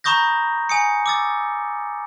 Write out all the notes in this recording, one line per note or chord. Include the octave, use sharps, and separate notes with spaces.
A#5 B5 C#6 D#6 G6 A#6
G#5 D#6 C#7
D6 E6 A6